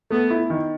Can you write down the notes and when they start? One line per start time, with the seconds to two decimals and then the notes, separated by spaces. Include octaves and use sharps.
0.10 A3 B3
0.30 E4
0.50 D#3